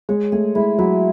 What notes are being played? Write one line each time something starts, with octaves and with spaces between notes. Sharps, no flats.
G#3 C#5
A3 G#4
G#3 E4
F#3 E4